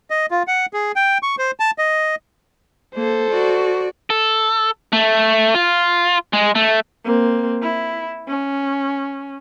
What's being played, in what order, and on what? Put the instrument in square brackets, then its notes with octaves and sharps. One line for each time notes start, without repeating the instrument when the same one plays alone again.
[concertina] D#5
F4
F#5
G#4
G5
C#6
C5
A5
D#5
[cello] A#3 [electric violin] A4 C5
[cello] F#4 D5
[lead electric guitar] A4
A3
F4
G#3
A3
[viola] A#3 C4
E4
C#4